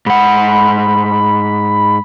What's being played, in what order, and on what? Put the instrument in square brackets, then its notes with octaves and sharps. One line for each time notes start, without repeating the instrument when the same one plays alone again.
[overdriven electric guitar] G#2 F#5 [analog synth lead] B5